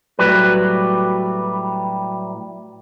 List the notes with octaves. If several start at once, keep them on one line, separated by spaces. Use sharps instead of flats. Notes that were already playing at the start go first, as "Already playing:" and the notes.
A2 F#3 G3 B4